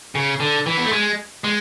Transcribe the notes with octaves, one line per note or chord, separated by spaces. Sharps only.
C#3
D3
E3
B3
A3
G#3
G#3